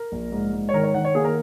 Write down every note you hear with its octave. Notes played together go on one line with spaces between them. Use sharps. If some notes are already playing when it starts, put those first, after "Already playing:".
Already playing: A#4
A#1
G#2
G#2
C#5
D#3 A#4
C#5
D#3 F#5
C#5
A#3 G#4
A#4